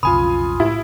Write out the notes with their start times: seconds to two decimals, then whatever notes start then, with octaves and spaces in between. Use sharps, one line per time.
0.03 B1 F2 C#3 F4 G#5 B5 D#6
0.60 A2 E4